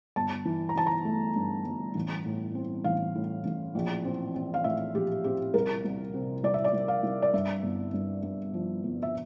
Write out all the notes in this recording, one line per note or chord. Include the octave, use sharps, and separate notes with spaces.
G1 A5
E3
A#5
E3 A5
A#5
A3
G2
G1
A1
A2
C4
A1 F5
A2
A1
A#1
C4
C4
F5
A2 E5
A#1 G4
C4 G4
C2 A#4
C2
C3
C2 D5
E5
D5
C2
F5
C2
D5
G2 E5
G1
G2
G2
F3
G1
E5